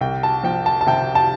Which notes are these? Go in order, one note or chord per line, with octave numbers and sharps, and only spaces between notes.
C2 G5
A5
F3 G5
A5
A5
C3 G5
A5